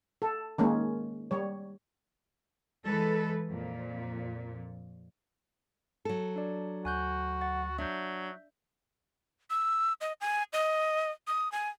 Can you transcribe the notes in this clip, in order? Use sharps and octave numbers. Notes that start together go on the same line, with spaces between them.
A4
D#3 G#3 A#3 C#4
G3 C#5
E3 G#3 A4 B4
F2 A#2
F#3 A4
D4 D5
D2 F#4 G#5 F#6 G6
F#5 A6
F#3 D4 E5 G6
E6
D#5
G#5
D#5
D#6
G#5